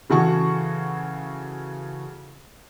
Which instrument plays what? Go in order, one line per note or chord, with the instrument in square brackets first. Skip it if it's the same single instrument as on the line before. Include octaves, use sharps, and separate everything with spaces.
[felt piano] C#3 E3 F#4 A4 F#5 C#6